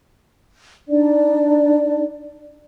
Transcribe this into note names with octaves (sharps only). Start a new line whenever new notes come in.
D4 D#4 D5